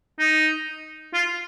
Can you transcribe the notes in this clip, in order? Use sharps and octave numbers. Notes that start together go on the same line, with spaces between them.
D#4
F4